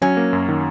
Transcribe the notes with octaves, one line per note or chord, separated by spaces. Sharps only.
F#3 C#4
A#3
F#2
D#3